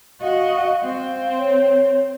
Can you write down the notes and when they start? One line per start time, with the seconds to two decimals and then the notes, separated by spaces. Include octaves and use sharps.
0.21 F#4 D#5 F5
0.83 C4 F5
1.37 C#5